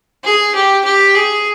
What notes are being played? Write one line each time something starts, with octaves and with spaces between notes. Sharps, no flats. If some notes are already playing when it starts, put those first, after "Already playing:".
G#4
G4
G4
G#4